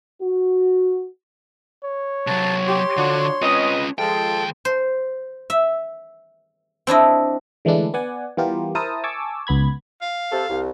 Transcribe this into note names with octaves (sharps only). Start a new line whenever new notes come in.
F#4
C#5
C3 F#3 A5
G4 C6
D3 F3 D4 F#4
C4 C#4 F4 B4 D#5
D#2 F3 G#3 A4 G5
C5
E5
C4 D4 E4 D#5
D3 E3 G#3 A3 D4 E4
B3 D5 F#5 G#5
E3 G3 B3 F4 G4 A#4
E4 A#4 C5 A5 D#6
G#5 A5 C#6 D6 E6
C#2 B3 B5 G#6
F5
C3 A4
C2